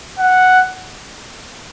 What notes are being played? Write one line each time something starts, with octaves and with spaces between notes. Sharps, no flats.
F#5